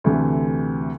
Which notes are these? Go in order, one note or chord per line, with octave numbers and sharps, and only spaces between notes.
D2 C3 E3 A3